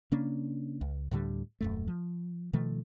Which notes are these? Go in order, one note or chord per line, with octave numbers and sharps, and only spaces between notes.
C#3 A#3 C#4 D4
C#2
D2 A2 D3 G3
D#1 F#2 A3
F3
B2 D#3 F3 A3